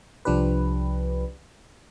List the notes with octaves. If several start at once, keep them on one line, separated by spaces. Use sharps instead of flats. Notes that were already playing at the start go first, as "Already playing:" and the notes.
C2 F3 D4 G4 B4